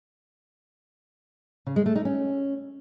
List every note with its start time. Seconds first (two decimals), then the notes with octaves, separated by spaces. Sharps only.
1.67 C#3
1.76 G#3
1.86 A3
1.96 D#4
2.05 C#4